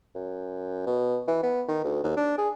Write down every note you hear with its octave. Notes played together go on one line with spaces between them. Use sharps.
F#2
B2
E3
B3
D#3
D2
D#2
D4
G#4